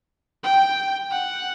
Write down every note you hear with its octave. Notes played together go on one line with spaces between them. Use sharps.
G5
F#5